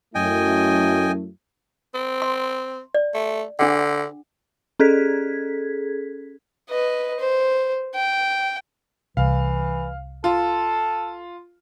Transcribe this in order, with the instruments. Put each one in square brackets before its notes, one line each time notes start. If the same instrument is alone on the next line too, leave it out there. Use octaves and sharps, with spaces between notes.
[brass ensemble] F#2 A3 E4 [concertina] D#5 G5 G#5
[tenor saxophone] C4
[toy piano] C6
D5
[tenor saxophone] A3
[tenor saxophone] D3 [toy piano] D4 G#4 F#5
[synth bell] C#4 G#4 A4 G#6 B6
[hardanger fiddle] B4 D#5
C5
G5
[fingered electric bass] C2 [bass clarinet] E3 [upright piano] F5
[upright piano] F4 [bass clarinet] A4